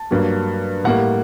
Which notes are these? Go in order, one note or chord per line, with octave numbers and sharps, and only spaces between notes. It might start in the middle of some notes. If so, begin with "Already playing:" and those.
Already playing: A5
G2 F#3 A#3
A2 G3 A#3 F#5